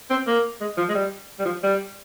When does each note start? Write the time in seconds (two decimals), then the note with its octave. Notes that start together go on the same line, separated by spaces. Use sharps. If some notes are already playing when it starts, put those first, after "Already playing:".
0.10 C4
0.27 A#3
0.61 G#3
0.78 F3
0.89 G#3
0.94 G3
1.39 G3
1.45 F3
1.63 G3